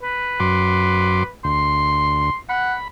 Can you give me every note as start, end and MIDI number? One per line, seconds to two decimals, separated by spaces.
0.03 1.32 71
0.40 1.23 42
0.40 1.23 84
0.40 1.23 86
1.45 2.30 38
1.45 2.35 84
2.49 2.74 78
2.49 2.88 83